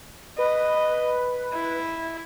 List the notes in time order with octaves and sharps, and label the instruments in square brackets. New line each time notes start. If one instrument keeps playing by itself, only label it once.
[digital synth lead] B4 [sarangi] D#5
[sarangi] E4